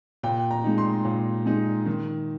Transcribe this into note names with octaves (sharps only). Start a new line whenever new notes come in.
A#2 G5
A#5
G#3 D#4
C6
A#2
G#3 D#4
D#3